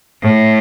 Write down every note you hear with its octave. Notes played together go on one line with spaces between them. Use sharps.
A2